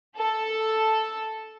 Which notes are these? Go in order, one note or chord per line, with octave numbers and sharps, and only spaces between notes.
A4